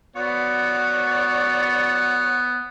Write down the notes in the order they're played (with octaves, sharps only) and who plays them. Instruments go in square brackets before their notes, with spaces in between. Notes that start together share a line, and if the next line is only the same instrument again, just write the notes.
[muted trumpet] B3 [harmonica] F#4 C#5 D5